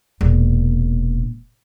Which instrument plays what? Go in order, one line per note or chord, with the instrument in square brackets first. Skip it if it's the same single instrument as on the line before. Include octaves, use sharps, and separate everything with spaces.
[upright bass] E1 A#2